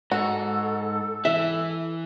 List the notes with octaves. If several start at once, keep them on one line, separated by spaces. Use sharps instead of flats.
G#2 F#4 A4
E3 E5